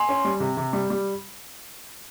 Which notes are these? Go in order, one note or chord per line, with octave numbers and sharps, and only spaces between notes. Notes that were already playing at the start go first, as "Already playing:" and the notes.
Already playing: G#5 C6
C#4
G3
C3
C3
G3
G3